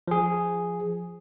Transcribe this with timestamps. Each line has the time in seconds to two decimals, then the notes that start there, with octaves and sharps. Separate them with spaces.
0.08 F3 G#4